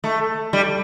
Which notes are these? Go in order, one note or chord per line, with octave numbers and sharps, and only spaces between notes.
A3
G3